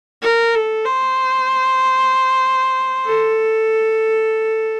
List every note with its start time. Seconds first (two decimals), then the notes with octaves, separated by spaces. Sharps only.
0.22 A#4
0.55 A4
0.85 C5
3.06 A4